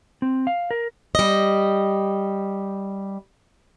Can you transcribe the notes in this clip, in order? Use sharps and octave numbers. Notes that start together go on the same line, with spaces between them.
C4
F5
A#4
G3 D#5